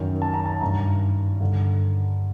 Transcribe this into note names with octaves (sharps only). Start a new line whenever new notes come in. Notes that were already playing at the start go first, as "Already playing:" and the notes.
Already playing: F#2 D#3
A5
A#5
A5
G2 D#3 A#5
G2 D3